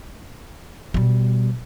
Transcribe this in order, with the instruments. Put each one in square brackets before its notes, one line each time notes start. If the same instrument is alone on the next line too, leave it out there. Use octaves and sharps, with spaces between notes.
[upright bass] B2 G3